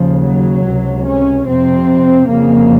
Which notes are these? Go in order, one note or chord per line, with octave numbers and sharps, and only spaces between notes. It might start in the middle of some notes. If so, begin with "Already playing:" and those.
Already playing: D#2 C#3 F3
F#3
C#2 C3
C#4
F2 C3 C4
F2 C#3 A#3